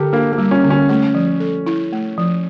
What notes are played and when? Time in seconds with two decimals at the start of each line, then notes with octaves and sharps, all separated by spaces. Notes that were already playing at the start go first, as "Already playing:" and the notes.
Already playing: D3 G4 A4 A#4
0.13 A#3 D4
0.32 A#3
0.38 G3
0.51 C#4
0.64 D3
0.70 C#4
0.90 A3 C#4
1.15 F3
1.40 A4
1.66 E4
1.93 A3
2.18 F3